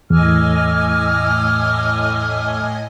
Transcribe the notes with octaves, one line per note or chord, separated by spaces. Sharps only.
E2 A2 D#5 G#5 D6 E6 F6